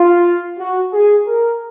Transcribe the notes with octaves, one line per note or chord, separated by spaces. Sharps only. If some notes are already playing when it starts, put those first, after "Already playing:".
Already playing: F4
F#4
G#4
A#4